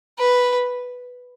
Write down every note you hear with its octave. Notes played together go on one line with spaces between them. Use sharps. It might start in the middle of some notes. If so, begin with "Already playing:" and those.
B4